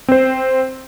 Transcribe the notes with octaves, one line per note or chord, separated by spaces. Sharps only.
C4 C5